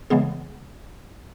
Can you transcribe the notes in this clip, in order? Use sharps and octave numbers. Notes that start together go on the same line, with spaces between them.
C#3 E3 G#3 B3 G#4